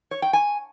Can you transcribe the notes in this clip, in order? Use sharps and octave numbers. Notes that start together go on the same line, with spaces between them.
C#5
G5
G#5